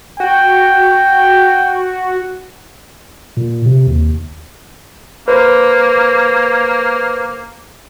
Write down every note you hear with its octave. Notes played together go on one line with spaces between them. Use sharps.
F#4 G5
A#2
C3
D#2
A#3 B4 C5